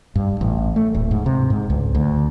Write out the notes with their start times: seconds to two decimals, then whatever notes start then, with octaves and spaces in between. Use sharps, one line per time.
0.16 G2
0.41 A1
0.76 A3
0.94 D1
1.11 G#2
1.26 C3
1.50 G#2
1.70 C#2
1.95 D2